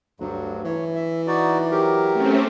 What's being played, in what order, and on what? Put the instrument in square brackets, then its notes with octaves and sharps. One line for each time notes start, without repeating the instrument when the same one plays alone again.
[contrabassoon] D2 [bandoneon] G2 F#3
[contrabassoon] E3 [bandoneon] C#5
[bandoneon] E5
D#4 F#4 D5
F#3 G4 A#4
[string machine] A3 C4 C#4